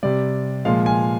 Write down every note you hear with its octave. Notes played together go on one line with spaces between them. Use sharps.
C3 G3 D5
A#2 F3 G#3 F5
G#5